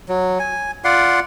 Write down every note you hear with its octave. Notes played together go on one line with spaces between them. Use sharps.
F#3
G#5
F4 D5 F#5 C6